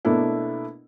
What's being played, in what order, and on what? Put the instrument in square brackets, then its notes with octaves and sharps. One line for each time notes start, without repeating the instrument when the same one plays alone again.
[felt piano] B2 A3 A#3 D4 E4